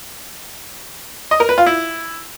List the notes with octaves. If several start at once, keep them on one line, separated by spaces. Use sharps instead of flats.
D#5
A#4
B4
F4
E4